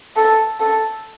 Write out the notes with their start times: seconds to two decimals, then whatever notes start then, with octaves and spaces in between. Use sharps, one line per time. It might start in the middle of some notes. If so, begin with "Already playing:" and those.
0.16 A4
0.60 A4